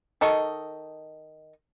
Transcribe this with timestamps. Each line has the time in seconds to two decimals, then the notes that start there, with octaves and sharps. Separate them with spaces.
0.21 D#3 A4 D#5 C#6